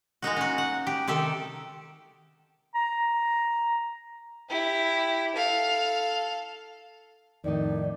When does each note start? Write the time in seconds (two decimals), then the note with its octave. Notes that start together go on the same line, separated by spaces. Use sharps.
0.22 G#3 A#3 D#4 F#4
0.36 C#4 F#4
0.58 F#5
0.87 G4
1.08 C3 D#3 G4 A4
2.75 A#5
4.49 E4 G4
5.34 A4 F5
7.44 F2 A2 D#3 D#4 D5